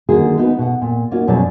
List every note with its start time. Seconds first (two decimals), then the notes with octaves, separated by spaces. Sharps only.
0.09 D3 D#3 A#3 F#4 G#4
0.37 B3 D#4 F#4 B4
0.59 B2 F#5
0.82 A#2
1.11 A#3 C#4 D#4 F4 F#4
1.27 F#2 B2 F#3 G#3 D5